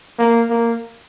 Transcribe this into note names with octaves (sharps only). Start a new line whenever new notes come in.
A#3
A#3